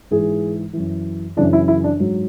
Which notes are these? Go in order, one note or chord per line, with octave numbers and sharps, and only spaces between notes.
G#2 E3 G#4
F#2 E3
F#2 C#3 E3 D4
E4
E4
D4
G#2 F#3